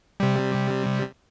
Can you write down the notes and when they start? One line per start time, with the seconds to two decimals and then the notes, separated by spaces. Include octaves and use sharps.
0.20 C3 G3